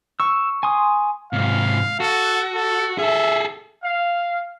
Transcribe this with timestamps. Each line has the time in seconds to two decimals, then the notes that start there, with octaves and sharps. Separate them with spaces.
0.20 C#6 E6
0.63 G#5 C6 D#6
1.33 G#2 C3 F5
2.00 F#4 A4
2.55 A4
2.98 G#4 A4 E5
3.83 F5